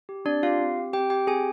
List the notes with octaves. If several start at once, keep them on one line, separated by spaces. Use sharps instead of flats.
G4
C4 D4 D5
F4 G4 F5
C4
G4
C4 G4 G5
G4 G5
C4 G#4 G#5